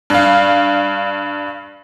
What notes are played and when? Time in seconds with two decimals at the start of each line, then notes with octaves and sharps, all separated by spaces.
0.10 G2 F5